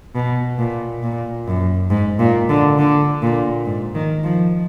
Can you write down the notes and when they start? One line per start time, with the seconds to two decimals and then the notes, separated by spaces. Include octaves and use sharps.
0.15 B2
0.59 A#2
1.03 A#2
1.47 F#2
1.91 G#2
2.20 A#2
2.49 D3
2.78 D3
3.22 A#2
3.66 G#2
3.95 D#3
4.24 F3